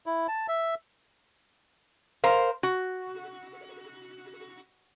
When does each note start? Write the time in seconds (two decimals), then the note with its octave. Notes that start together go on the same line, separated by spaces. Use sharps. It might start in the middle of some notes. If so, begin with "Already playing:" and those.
0.06 E4
0.28 A5
0.48 E5
2.24 A#4 C5 F5
2.63 F#4